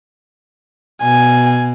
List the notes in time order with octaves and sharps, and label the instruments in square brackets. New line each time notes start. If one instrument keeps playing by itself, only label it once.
[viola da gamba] B2 [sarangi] G#5